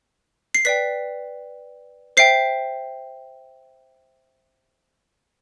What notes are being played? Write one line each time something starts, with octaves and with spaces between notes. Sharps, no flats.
C7
B4 D5 G5 B6
C5 E5 G5 C7